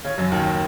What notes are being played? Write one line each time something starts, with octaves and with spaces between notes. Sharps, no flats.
C#3 C#4
F#2 F#3
D#2 D#3